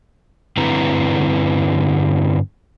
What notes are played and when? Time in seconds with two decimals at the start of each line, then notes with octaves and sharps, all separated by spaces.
0.57 G2 D3 C4 E4 B4 A#5